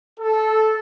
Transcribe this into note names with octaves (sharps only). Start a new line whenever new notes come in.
A4